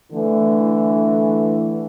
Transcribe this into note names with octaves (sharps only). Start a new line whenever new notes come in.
D3 E3 A3